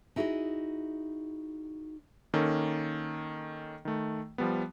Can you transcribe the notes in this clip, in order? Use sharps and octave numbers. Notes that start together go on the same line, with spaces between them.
D#4 E4 F#4 G#4 C5 D#5
D#3 A#3 C#4 A4
D#3 A3
F3 G3 B3